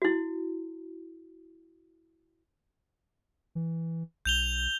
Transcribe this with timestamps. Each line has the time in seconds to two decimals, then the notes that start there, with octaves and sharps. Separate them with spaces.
0.02 E4 F#4
3.55 E3
4.25 B1 G6 F7 G7